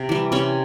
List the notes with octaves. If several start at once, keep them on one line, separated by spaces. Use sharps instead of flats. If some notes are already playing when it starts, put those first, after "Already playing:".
Already playing: C3 C4
E3 G3
C3 C#4 C#5